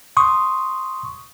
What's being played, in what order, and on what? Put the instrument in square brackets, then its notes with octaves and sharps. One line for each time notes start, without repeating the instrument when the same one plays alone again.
[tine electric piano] C6 C#6 D#6